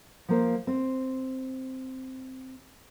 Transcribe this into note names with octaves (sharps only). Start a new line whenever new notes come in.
F3 A#3 C5
C4